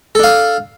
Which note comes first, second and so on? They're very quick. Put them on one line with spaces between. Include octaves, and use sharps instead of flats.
A4 D4 F5